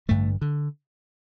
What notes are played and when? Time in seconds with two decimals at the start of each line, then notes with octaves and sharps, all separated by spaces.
0.08 A1 G2 D3 A3
0.42 D3